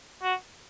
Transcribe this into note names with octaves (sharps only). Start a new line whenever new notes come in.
F#4